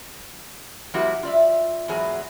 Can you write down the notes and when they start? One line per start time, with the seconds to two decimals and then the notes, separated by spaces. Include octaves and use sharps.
0.94 F3 G3 A#3 E4 F#4 G4
1.23 F4 D5 E5
1.88 E2 G#2 F#3 G#4